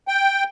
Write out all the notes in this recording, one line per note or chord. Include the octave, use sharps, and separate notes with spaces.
G5